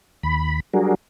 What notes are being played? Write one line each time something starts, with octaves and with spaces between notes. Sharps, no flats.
D#2 B5
F#3 G3 D4 F#4 G#4 A#4